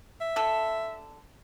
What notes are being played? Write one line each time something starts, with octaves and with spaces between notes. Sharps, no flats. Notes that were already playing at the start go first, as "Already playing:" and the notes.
E5
D3 A4